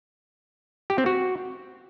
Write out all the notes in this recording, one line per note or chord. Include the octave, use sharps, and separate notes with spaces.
G4
C4
F#4